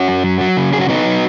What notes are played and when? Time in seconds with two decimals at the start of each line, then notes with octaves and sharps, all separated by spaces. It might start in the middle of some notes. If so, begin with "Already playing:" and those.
Already playing: C#4 F#4
0.08 F#2
0.24 F#3
0.41 F#3
0.57 C#3
0.73 F#3 G#4
0.81 F#4
0.89 F#3 B3 D#4
1.05 F#3